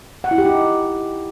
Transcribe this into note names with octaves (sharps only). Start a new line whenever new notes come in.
F#5
E4
G4
D#4